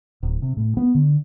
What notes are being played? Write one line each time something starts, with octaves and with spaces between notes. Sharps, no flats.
D1
C3
A2
B3
D3